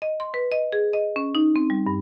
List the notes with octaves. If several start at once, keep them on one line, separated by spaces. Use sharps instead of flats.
D#5
C6
B4
D#5
G#4
D#5
C#4
D#4
C4
G3
G2